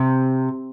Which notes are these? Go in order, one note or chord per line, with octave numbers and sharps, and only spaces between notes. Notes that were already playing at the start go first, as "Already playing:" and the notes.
Already playing: C3